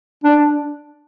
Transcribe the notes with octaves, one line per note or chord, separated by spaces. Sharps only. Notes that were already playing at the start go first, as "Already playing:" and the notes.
D4